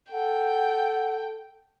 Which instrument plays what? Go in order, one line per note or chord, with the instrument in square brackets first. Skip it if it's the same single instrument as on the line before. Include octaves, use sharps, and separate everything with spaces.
[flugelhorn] A4 [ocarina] F#5 [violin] G5